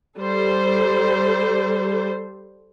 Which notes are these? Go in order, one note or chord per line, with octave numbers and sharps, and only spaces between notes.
G3 A4 C5